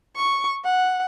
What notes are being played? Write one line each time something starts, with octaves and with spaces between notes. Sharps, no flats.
C#6
F#5